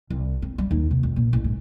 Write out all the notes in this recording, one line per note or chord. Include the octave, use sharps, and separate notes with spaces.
C2
C4
G3
D#2
C3
F1
A#2
A1
G#2